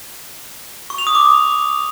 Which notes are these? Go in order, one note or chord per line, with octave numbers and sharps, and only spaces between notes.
C#6
F7
D#6
D6